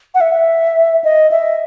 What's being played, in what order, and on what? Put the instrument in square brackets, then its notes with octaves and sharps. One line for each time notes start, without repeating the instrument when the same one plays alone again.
[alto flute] F#5
E5
D#5
E5